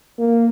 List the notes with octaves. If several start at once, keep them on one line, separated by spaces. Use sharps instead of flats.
A#3